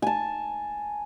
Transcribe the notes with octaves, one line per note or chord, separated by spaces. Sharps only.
G#5 A5